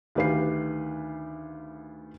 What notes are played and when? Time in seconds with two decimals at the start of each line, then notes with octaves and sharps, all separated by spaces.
0.15 D2 D#3 G4 B4 F5 C7